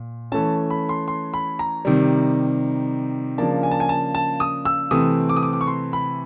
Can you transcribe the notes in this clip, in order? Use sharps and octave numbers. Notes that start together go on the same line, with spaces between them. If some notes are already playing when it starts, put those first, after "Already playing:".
Already playing: A#2
E3 A3 C#4 A5
B5
C6
C6
B5
A#5
C3 D#3 G3
C#3 F3 A#3 D4 A5
G#5
A5
G#5
A5
A5
D#6
E6
C3 E3 A3 C4 D#6
D6
D#6
D6
D6
C#6
C6
B5